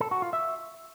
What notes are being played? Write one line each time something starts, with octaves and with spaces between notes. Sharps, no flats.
A4
F#4
F4
E5